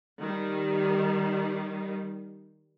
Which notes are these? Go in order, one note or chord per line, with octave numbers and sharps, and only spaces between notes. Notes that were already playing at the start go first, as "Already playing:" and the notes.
D#3 G3